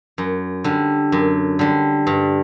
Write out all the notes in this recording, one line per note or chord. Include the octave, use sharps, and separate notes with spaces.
F#2
D3 G3
F#2
D3 G3
G2